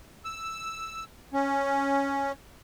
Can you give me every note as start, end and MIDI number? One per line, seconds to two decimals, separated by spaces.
0.25 1.04 88
1.33 2.32 61